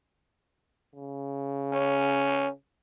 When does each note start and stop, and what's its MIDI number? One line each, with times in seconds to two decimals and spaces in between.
0.95 2.53 49
1.73 2.48 61